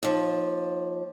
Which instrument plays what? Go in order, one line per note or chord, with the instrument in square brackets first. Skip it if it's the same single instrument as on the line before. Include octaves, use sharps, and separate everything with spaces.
[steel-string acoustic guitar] D#2 F3